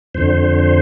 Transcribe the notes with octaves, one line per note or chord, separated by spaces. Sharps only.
F2 D3 C5
C5